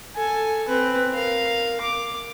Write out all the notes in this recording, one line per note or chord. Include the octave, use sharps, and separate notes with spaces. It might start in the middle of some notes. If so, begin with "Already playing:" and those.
A4 G#5
C4 B4
A#4 F5
D6